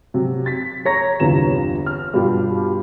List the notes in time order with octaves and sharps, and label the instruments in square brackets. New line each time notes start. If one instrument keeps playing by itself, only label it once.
[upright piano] C3 F#3
A6 B6
C#5 A#5 A#6
G1 E2 C3 F4 A#5 E7
F6
G2 B2 F4 G4